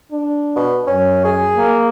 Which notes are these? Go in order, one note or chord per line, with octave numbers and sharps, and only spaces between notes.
D4
B2
F#2 C#4
G#4
A#3